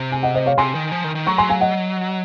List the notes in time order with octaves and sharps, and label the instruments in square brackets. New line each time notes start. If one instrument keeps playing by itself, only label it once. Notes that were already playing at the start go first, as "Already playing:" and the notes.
Already playing: [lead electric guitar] C3
[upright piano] G#5
D#5 F#5
C5 D#5
C#5 F5
[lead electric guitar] C3 [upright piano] G#5 C6
[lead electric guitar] D#3
F3
D#3
D#3
[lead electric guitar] F#3 [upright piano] A#5 C#6
[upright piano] G#5 C6
F5 G#5
D#5 F#5